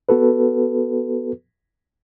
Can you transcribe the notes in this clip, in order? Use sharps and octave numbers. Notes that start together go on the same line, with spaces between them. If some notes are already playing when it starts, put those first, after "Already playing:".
B3 F#4 A4 B4